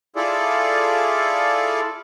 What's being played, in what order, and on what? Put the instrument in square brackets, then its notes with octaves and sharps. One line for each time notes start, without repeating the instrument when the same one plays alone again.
[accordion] E4 F4 G#4 A4 D5